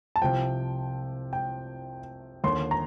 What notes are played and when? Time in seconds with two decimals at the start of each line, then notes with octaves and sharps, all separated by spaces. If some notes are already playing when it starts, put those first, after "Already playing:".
0.16 A5
0.22 C2 C3 F3 G5
1.33 G5
2.44 D#2 D3 F3 C6
2.71 A#5